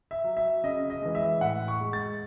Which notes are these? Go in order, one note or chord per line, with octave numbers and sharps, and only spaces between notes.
E5
F#3
E5
C#3 D#5
D#5
E3 G#3
E5
A2 F#5
C#6
G#3
A6